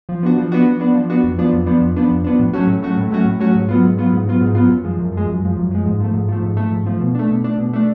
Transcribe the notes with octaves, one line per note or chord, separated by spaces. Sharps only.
F3
B3 D4 F#4
F3
B3 D4 F#4
F3
B3 D4 F#4
F3
B3 D4 F#4
F2
F3 B3 D4
F2
F3 B3 D4
F2
F3 B3 D4
F2
F3 B3 D4
A2
F#3 A3 C#4 F#4
A2
F#3 A3 C#4 F#4
A2
F#3 A3 C#4 F#4
A2
F#3 A3 C#4 F#4
G#2
F#3 B3 F4
G#2
F#3 B3 F4
G#2
F#3 B3 F4
G#2
F#3 B3 F4
F#2
F3 G#3
F#2
F3 G#3
F#2
F3 G#3
F#2
F3 G#3
G#2
F3 A3
G#2
F3 A3
G#2
F3 A3
G#2
F3 A3
B2
A3 D4
B2
A3 D4
B2
A3 D4